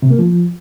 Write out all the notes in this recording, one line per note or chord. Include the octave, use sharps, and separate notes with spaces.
C3
A#3
F3